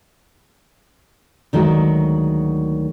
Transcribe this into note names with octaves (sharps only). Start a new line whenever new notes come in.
D2 D#3 F#3 G#3 F#4